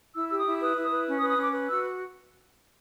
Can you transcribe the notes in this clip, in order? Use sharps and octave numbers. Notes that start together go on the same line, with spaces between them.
E4 E6
G4 E6
D#6
E4
B4 D#6
E4
D#6
B4
C#4
D#6
B4
D#6
C#4 D6
B4
F#4 E6